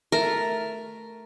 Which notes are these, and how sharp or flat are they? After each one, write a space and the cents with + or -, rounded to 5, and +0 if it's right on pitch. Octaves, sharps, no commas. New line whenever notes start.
A3 +0 A#4 +0